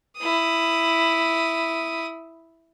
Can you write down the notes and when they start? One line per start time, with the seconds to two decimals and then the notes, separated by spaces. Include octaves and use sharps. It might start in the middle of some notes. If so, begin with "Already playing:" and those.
0.17 E4 D#6